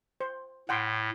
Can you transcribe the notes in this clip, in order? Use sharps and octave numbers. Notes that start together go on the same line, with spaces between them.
C5
A2 F#5 G5 C6